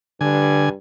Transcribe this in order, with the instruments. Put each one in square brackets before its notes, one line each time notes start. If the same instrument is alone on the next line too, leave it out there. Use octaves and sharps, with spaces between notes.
[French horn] G2 [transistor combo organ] D3 G#5